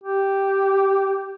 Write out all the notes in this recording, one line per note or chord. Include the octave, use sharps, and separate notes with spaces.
G4